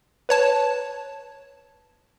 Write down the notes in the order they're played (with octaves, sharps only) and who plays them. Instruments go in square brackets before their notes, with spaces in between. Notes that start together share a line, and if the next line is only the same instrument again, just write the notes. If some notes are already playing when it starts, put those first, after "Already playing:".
[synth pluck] B4 C#5 A5